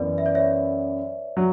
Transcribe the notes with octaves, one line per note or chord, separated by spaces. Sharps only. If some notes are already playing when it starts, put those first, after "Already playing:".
Already playing: F#2 E3 B3 B4 D5
E5
D5
C#5 E5
F#3